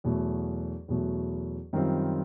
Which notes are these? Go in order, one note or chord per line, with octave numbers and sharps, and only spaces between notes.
E2 B2 F#3 A3
E2 B2 F#3 A3
F#2 D#3 G3 C4 F4